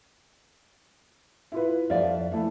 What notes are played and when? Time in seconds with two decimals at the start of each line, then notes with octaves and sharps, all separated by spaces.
1.52 E4 F4 B4
1.90 F2 D5 E5 F5
2.32 E3 A3 E4